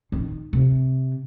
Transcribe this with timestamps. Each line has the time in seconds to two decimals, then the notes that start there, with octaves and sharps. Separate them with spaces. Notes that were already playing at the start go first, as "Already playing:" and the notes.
0.12 D#3
0.53 C3